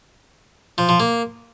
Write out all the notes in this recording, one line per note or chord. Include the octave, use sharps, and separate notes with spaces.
F3
F3
A#3